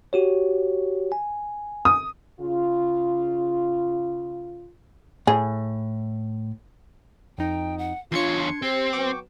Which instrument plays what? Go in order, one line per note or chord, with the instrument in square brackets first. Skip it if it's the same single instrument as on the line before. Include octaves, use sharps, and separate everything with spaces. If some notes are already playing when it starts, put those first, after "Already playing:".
[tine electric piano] F#4 G4 C#5
G#5
[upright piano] D#6
[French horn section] C#3 F4
[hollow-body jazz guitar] A2 [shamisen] G#4
[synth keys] F2 D#4 [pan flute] G5
[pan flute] F#5
[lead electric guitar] E2 C#5 [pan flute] D4 [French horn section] F4 [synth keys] C6 G#6 C#7
[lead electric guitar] C4 [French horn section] G4 [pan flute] C5
[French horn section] F#3 B3 [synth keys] G5 C#6 D6